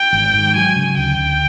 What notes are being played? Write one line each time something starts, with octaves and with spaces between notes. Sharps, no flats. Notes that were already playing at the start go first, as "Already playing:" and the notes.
Already playing: G5
G#1
G#2
F#3 G#5
C#3
D2 G5
D2